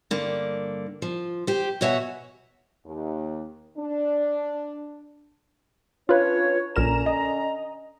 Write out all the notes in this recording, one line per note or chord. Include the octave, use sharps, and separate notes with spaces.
G2 D3 A#3
F3
G4 C5
B2 F#4 C#5 E5 F#5 G#5
D#2
D4
C#4 D4 F4 B4 C#5
A#1 D3 C#4 A#4 A#5 E7
D#5